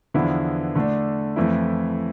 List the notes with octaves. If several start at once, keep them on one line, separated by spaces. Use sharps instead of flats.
E2 D3 F3 B3 E4
D3 A3 D4
F2 E3 A3 E4